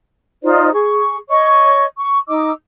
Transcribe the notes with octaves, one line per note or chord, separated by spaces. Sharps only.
D#4 F4 C5 D5
G#4 C#6
C#5 D#5 C#6
C#6
D#4 D#5 D6 E6